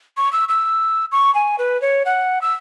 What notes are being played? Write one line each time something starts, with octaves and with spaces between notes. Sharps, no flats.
C#6
E6
E6
C#6
G#5
B4
C#5
F#5
E6